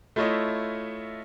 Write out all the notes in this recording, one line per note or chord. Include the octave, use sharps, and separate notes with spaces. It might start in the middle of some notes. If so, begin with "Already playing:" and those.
A3 E4 F4 C#5 D#5 E5